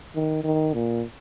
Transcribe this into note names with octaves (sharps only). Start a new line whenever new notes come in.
D#3
D#3
A#2